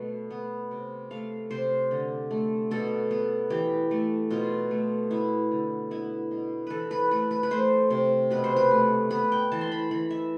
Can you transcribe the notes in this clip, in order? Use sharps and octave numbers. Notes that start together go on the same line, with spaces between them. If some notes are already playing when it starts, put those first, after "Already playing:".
Already playing: B2 A3
B3
C3
A3 F5
C3 C5
D3
A3
B2 A4
B3
E3 G4
A3
B2 F4
A3
B3 E4
D3
B3 E4
B2
E3 A4 B4
B4
A3 B4
B4
B4
A3 C5
C3
B2 B4
C5
B4
A3
B3 B4
G5
E3 A5
C6
B5
E3 B5
E5